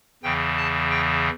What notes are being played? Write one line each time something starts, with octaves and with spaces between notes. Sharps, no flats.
E2 C#3 E3 G5
A5
G5